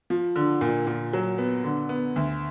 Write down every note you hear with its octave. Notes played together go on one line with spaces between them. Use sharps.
F3
D3
A#2
A#2
F#3
B3
D3
B3
D2